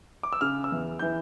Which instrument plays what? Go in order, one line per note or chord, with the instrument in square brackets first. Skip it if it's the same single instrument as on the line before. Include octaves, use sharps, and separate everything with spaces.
[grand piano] D6
E6
C#3 F6
E6
E2
E3 G6